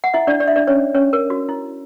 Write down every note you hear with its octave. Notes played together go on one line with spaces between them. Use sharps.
F#5
E4 E5
D4 D5
D5
E5
D4 D5
C#4 C#5
C#4 C#5
A#4
F#4
E4